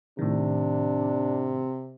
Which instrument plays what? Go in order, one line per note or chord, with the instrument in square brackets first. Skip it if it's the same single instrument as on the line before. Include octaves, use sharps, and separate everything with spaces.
[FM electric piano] A2 D#3 [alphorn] C3 [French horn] D4